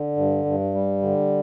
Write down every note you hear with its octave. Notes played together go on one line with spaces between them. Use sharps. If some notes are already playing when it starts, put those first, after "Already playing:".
Already playing: D3
G2
G2
G3
D3